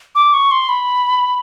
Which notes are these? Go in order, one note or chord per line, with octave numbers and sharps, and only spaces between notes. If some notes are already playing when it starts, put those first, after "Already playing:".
D6
C#6
C6
B5